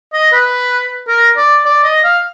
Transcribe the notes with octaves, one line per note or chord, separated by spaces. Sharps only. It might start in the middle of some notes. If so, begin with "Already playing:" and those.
D#5
B4
A#4
D5
D5
D#5
F5